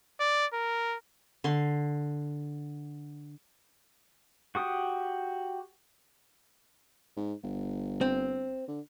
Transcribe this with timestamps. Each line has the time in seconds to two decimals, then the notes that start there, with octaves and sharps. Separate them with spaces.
0.20 D5
0.53 A#4
1.44 D3 C6
4.55 F#4 G4 D#6
7.17 G#2
7.43 G1
8.01 C4
8.68 D3